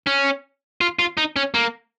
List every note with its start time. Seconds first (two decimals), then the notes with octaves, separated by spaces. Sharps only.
0.07 C#4
0.81 F4
0.99 F4
1.17 D#4
1.36 C#4
1.54 A#3